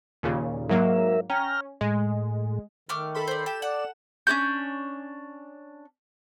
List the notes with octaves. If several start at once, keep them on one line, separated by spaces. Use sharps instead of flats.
D#2 A#2 C#3
G#2 F#3 A#3 A#4 E5
C#4 G5 A#5 F6
A2 G#3
D#3 A3 D6 F6
A4 B5 C6
C5 D5
G4 A4 E7
D5 F#5
C#4 D4 F#4 G6